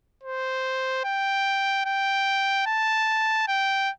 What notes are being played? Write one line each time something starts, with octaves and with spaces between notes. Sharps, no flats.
C5
G5
G5
A5
G5